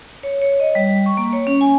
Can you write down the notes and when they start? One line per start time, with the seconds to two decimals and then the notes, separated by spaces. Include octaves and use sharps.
0.23 C#5
0.41 C#5
0.60 D#5
0.75 G3
1.06 C#6
1.17 A#3
1.33 C#5
1.47 C#4
1.61 G#5